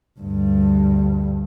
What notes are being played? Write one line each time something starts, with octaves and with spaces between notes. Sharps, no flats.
D2 G2